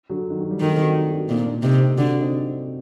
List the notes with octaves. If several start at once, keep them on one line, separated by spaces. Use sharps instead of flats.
D3 F#3
D#3
F#3
G3
D#3 F#3 A3
A3 C4
G4
D4 F#4
D#4 G4
D4 F#4
A#2 C4 D#4
A#3 D4
C3 C4 D#4
D#4 G4
D3 D4 F#4
D4 F#4
C4 D#4